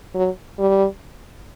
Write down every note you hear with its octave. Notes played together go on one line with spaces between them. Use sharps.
F#3
G3